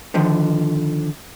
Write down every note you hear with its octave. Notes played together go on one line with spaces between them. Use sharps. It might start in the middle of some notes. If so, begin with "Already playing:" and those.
D3 D#3 F3